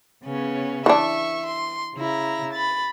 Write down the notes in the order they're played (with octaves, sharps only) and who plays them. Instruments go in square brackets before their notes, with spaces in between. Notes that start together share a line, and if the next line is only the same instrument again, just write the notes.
[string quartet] C#3 B3 C#4
[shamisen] E3 D4 [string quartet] E5 C#6
[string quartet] C6
C#3 E4 A#5
B5 A6